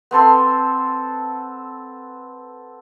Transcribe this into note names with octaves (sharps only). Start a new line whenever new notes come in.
B3 C4 A4 C6